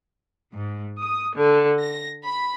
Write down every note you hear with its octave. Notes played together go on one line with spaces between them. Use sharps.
G#2
D#6
D3
A#6
B5